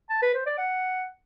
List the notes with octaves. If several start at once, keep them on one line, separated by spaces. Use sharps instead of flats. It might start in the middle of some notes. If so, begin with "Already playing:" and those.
A5
B4
C5
D5
F#5